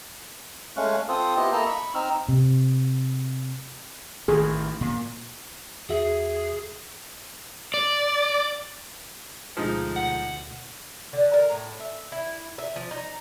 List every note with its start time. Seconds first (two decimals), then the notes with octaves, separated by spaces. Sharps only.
0.77 G#3 A3 C#4 F5 C#6 F#6
1.09 C4 F4 A4 C5 D#6
1.37 B3 E4 F4 G4 C5 D#5
1.53 A#3 E4 A4 D#5 A#5 E6
1.66 B5 C#6
1.95 C4 D#4 E6 F6
2.29 C3
4.28 A1 D#3 E3 G#4
4.81 A#2
5.89 E2 F#4 G#4 E5
7.74 D5
9.57 D2 B2 F3 G#3 D#4
9.96 F#5
11.13 D3
11.33 A#4
11.51 A2
11.80 E5
12.12 E4
12.58 E5
12.76 F3
12.91 D#4